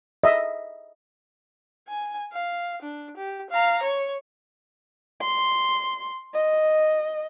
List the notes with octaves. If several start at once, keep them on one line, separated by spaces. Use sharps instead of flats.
D#5 E5
G#5
F5
D4
G4
F5 A#5
C#5
C6
D#5